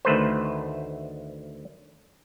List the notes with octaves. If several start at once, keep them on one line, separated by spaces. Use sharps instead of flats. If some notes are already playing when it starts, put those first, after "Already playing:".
D2 D#3 A3 B4 C5